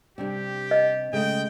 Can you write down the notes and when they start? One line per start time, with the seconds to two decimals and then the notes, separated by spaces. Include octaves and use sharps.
0.18 C3 G3 D4 G4
0.71 D#5
1.13 C#3 G#3 A3 G5